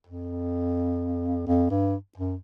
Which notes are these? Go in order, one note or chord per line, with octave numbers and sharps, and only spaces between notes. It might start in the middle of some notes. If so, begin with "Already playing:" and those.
F2
F2
G2
F#2